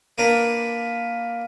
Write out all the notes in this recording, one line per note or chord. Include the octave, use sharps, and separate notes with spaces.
A#3 D4 A#4 B4